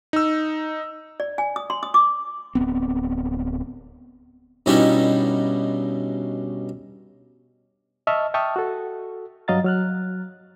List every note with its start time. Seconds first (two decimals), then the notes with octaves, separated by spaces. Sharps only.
0.13 D#4 E6
1.20 D5
1.38 G#5
1.56 D#6
1.70 C6
1.83 D#6
1.94 D6
2.55 D1 B3 C4
4.66 G2 B2 G3 C#4 D#4 E4
8.07 D#5 E5 A5 C#6 E6 F6
8.34 E5 G5 A5 C#6 D#6 F6
8.56 F#4 A4
9.48 G2 F#3 D#5 F5 A#5 A6
9.64 F#3 F6 F#6